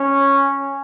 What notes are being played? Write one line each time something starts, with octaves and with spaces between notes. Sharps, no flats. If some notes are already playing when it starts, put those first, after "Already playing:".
Already playing: C#4